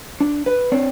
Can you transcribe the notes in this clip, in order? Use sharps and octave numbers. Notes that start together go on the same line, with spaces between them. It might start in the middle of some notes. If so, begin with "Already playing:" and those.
D4
B4
C4 D4 C#5